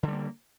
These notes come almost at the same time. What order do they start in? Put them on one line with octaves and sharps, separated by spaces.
D3 G3 A#3